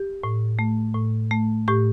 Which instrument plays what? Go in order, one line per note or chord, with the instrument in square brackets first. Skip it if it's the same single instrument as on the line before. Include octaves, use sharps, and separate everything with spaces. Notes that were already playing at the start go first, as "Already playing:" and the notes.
Already playing: [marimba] G4
A2
A3
A2
A3
A2 G4